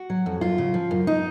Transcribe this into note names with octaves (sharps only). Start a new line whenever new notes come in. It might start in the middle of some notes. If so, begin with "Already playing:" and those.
Already playing: F#4
F#3
F2
F#2 F4
C#3
F3
F#2
D#4